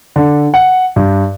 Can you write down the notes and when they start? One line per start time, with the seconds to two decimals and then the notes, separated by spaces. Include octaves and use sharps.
0.16 D3
0.54 F#5
0.96 G2